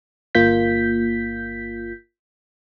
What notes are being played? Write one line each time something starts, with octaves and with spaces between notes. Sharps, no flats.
G1 A#3 F4 G6 B6